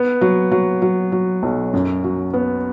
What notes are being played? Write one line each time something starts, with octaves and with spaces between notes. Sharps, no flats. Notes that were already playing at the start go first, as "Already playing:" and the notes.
Already playing: B3
F#3
F#3
F#3
F#3
B1
F#2
F#3
B3